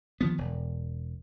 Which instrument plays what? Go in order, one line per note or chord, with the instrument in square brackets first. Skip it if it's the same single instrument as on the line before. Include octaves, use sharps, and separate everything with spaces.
[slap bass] D#3 F3 B3
E1